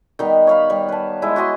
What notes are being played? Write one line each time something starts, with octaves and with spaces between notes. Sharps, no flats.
D#3 G3 B3
C#5 F5 B5
G3
B4 A5
G#3 E4 D#5
F#4 G#4 D#5 C6